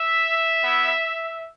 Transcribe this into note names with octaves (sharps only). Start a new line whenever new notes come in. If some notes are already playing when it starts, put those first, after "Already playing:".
Already playing: E5
B3 E4